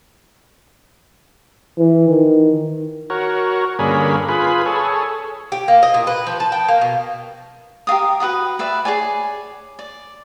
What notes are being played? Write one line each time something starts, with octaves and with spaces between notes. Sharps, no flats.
E3
D#3
F#4 A#4 C#5
G2 D3 A#3 C#4 G#4 B5
F4 G#4 B4 B5
G#4 A4 C#5
G4
A#3
D#5
A#2
B4
F3
A5
G5
A#3
B2
G4 A#4 F5 D#6
F#4 B4 F#5 D#6
B4 D5 E5
G#4 C#5 D5 G#5
D5